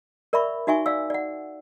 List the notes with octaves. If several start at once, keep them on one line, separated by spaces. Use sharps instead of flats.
A#4 D5 E5 B5 C#6
D#4 F#4 E5 G#5 C#6
D5 F5 E6
D5 F#5